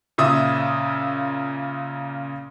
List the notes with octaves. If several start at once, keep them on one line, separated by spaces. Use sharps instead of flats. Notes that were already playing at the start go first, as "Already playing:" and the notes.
A#2 C#3 E5 D#6